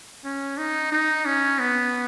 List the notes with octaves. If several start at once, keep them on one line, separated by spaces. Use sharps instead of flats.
C#4
D#4
D#4
C#4
B3